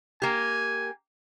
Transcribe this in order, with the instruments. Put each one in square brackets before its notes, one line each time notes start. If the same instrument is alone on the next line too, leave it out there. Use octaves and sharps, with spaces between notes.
[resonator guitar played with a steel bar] A#3 G4 [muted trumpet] G#5